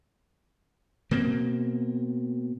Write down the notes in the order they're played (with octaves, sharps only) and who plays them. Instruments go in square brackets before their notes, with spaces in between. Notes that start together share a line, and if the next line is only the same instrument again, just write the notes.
[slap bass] B2 A#3 C4